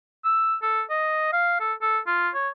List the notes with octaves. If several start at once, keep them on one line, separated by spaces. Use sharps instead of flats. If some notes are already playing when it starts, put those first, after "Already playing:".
E6
A4
D#5
F5
A4
A4
F4
C#5